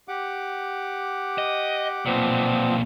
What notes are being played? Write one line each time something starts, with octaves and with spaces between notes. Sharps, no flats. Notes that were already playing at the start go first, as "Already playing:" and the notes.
G4 F#5 D6
D#5
B1 A#2 F3 B3 C4